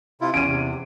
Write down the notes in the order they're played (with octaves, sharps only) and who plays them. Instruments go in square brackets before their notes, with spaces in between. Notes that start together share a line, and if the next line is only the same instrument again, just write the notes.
[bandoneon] C3 E4 F4
[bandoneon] E2 [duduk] C#4 [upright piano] D7 D#7
[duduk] C3